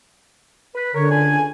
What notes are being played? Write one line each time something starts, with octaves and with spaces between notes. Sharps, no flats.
B4
D3 A#4 C#5
C#2 D4 G#5